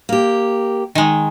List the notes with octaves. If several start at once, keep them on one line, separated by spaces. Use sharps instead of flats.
A#3 G4
D#3 G#3